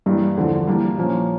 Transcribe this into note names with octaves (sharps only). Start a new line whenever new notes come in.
G2 E3 G3 A#3
E2 D3 F3
E3 G3 A#3 D4
A#2 F3 A#3 C#4